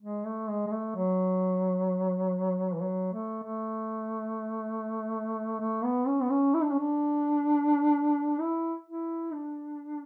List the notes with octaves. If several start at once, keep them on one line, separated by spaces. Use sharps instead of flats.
G#3
A3
G#3
G#3
A3
F#3
E3
F#3
A3
A3
A3
B3
C#4
B3
C#4
E4
D4
C#4
D4
E4
E4
D4